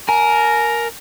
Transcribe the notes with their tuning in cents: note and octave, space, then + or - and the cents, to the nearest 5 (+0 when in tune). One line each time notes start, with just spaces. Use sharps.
A#4 +0 G#5 +30